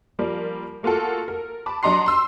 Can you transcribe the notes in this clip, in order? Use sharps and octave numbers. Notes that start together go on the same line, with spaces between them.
F3 G3 A#3
A3 A#3 F4 F#4 A4
A#4
A5 B5 D6
F#3 D4 D#5 A#5 C6 C7
C6 E6